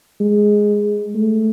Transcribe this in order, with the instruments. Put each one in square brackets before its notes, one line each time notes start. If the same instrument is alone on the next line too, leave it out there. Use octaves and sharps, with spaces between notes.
[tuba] G#3
A3